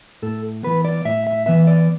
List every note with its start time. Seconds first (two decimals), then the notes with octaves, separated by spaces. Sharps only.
0.22 A2 A4
0.63 E3 B3 B4
0.85 D5
1.05 A2 E5
1.27 E5
1.46 E3 B3 E5
1.67 D5